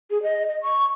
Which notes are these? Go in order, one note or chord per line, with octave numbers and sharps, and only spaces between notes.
G#4
D#5
D#5
C#6